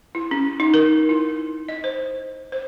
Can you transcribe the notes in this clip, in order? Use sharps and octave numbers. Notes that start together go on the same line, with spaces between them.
E4
C#4
D#4
A#4
E4
D#5
C5
C5